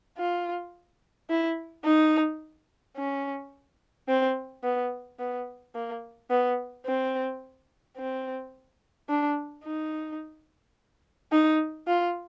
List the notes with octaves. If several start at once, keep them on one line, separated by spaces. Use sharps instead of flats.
F4
E4
D#4
C#4
C4
B3
B3
A#3
B3
C4
C4
D4
D#4
D#4
F4